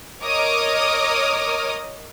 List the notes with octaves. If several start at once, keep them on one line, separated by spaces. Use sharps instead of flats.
A#4 C#5 D#5 D6 D#6 F6